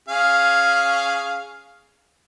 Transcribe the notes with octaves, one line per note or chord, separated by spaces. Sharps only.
C#4 G#4 F5